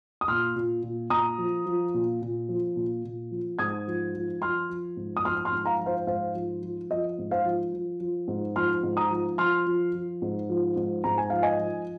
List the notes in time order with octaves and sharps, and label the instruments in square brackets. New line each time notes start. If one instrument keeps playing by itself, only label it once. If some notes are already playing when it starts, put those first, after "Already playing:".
[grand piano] D#6
A#2 C6 F6
A#2
A#2
A#2 A#5 D#6
F3
F3
A#2
A#2
F3
A#2
A#2
F3
G#2 D#6 G#6
F3
F3
F3 C6 F6
F3
G#2
D#6
F3 C6 F6
C6 F6
G#2
F5 A#5
F3
C5 F5
G#2 C5 F5
F3
F3
F3 D#5
G#2
C5 F5
F3
F3
F3
G#2
F3 C6 F6
G#2
A#5 D#6
F3
F3 C6 F6
F3
F3
G#2
F3
G#2
G#2 A#5
G#5
F3 F5
D#5 G#5
F3